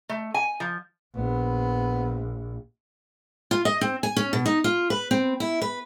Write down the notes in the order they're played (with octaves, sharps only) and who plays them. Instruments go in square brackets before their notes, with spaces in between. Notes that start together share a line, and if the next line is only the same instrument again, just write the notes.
[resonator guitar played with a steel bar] A3
G#5
F3
[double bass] A#1 [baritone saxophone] B3
[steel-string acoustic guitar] F4
D#5
C4
G#5
C#4
B2
D#4
F4
B4
C4
E4
B4